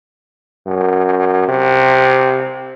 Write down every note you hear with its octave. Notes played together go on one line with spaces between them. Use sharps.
F#2
C3